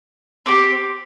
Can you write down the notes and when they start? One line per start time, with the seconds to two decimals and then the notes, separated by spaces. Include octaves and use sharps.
0.46 C4 G4 D6